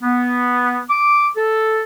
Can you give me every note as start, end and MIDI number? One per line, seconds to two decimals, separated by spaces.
0.03 0.83 59
0.90 1.28 86
1.37 1.82 69